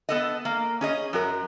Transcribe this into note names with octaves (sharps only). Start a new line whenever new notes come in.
B3 A4 D#5
A#3
C#4 G#4 D#5
F#2 F#4 A#4